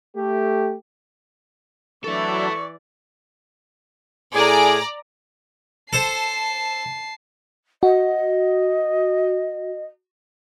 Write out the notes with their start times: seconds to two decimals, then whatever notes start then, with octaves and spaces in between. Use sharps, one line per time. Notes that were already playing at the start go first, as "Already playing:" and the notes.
0.15 A3 G4
2.04 E3 F#3 D4 E4 A4 D5 E5 C#6
4.34 A2 G#4 D5 G#5 A#5
5.93 A4 C5 A5 C7
7.83 F#4 D#5